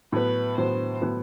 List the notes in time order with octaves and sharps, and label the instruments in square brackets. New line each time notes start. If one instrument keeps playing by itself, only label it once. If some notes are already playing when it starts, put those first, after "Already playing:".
[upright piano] A2 F#3 B3 [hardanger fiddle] B4
[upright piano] A2 F#3 B3 [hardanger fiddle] C5
[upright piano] A2 F#3 B3